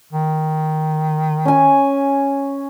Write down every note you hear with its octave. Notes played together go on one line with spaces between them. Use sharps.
D#3
C#4 G#5